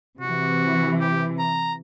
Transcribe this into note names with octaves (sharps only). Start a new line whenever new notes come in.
C3 E3 F#4
G4
A#5